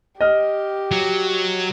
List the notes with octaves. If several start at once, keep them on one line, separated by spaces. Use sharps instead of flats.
G4 D#5 F6
F#3